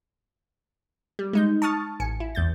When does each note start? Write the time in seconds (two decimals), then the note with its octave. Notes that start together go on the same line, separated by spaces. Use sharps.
1.19 G3
1.33 G#3 D#4 G6
1.62 A5 C#6 D#6 F6 A6
2.00 A1 G#5 C#7
2.20 E4
2.35 E2 G6 A6